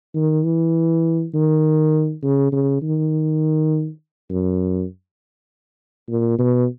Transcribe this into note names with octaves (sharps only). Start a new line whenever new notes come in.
D#3
E3
D#3
C#3
C#3
D#3
F#2
A#2
B2